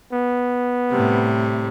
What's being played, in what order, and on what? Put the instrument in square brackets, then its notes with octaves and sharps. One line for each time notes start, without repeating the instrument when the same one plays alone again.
[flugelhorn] B3
[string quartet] A2 C3 G3